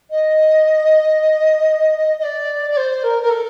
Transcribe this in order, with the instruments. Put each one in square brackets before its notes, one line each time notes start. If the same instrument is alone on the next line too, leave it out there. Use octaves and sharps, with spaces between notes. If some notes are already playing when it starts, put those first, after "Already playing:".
[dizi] D#5
D#5
D5
D5
C5
A#4
A#4
A4